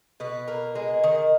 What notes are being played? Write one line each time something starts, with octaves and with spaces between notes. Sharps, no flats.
B2 B4
A#3
G#3
D#3